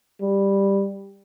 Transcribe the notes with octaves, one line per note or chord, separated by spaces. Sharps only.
G3